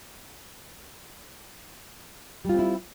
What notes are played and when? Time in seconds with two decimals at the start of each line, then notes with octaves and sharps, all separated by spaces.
2.45 G3
2.49 F4
2.54 C4
2.59 E4